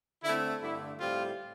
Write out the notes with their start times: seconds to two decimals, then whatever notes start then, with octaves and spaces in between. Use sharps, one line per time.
0.23 D3 A3 C4 E4
0.62 G2 D3 A3 E4
1.00 A2 G3 C4 F4